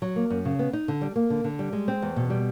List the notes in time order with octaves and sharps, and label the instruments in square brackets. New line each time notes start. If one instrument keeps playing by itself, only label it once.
[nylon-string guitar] F#3
A#3
F#2
C#3
B3
D#4
D3
G3
A#3
D3
D3
G3
G#3
C4
E2
B2
G3